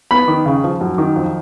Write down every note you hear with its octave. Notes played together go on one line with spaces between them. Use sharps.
B3 B5
D#3
C#3
F3
F#2
D#3
F2